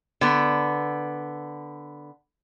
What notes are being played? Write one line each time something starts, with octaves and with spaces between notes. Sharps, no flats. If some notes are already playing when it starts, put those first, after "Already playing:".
D3 B3